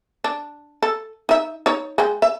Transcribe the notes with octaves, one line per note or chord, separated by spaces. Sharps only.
D4
A4
D#4 E5
D#4 C#5
G#3 G5
E5